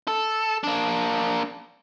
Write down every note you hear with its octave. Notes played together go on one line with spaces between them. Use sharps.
A4
A#3 D4